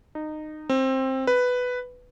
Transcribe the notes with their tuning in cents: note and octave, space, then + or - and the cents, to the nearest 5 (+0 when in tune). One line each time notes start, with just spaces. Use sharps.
D#4 -20
C4 +15
B4 +5